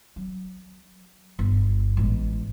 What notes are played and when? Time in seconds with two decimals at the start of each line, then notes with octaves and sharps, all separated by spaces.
0.16 F#3
1.39 G1
1.97 A1 G#3